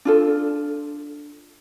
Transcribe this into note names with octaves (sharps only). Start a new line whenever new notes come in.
D4 F4 A4